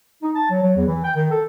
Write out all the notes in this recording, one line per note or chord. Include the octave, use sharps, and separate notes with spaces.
D#4
A5
F#3
F#3
E2
E3
G5
D#3
A4